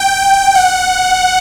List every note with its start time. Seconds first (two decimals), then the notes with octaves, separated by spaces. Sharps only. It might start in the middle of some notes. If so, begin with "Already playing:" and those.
Already playing: G5
0.17 G5
0.55 F#5